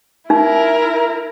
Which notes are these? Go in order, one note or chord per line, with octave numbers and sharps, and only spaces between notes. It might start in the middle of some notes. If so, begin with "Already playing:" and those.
D#4 E4 A#4